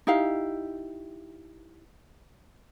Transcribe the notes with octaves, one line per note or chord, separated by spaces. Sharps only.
D#4 E4 G4 F5